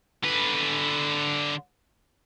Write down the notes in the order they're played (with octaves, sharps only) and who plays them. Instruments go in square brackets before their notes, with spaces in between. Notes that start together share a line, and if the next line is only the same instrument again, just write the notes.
[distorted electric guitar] D3 B4